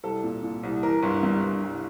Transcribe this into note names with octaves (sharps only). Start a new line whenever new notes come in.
C2 A4
A#2
A#2
C2
E3 A#4
G1
G2
G1
C2